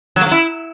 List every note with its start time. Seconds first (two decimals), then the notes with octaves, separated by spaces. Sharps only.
0.16 F#3
0.21 A#3
0.26 F#3
0.31 E4